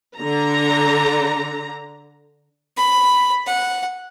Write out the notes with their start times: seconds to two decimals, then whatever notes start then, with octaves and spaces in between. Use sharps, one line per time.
0.18 D3 A#5
2.77 B5
3.46 F#5